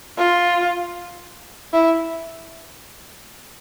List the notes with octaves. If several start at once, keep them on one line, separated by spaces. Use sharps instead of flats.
F4
E4